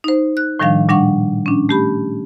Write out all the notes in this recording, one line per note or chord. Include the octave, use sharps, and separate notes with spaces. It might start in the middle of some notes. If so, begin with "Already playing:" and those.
D#4 C5
F#6
A2 D#3 F3 G3 D4 F5
A#2 G3 D4 F#5 C#6
C#4 D4
A3 G4 B5